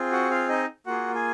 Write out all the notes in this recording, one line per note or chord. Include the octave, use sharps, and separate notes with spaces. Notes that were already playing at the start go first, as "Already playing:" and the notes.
Already playing: C4 F4 G#4
F#4 F#5
F4 F5
D#4 D#5
A#3 F4 F#4 G#4 F#5
G#4 G#5